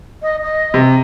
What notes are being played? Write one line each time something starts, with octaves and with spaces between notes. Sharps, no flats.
D#5
D#5
C3